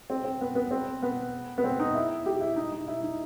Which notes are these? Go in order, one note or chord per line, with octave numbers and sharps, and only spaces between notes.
C4
C4
B3
B3
C4
B3
B3
C4
D#4
E4
G4
E4
D#4
D#4
E4
D#4